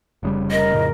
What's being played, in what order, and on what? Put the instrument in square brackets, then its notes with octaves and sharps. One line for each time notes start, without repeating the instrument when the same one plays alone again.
[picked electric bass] F1 C#3 G3
[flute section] A#4 [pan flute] D#5
[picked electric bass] F2 A2 C#3